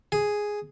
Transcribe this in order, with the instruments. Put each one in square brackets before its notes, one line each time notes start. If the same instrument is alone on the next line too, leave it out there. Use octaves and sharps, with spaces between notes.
[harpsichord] G#4